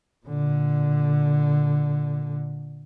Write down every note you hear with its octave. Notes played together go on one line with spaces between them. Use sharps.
A#2 D3